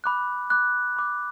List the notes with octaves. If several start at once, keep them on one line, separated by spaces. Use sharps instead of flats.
B5 D6 F#6
B5 D6 F#6
B5 D6 F#6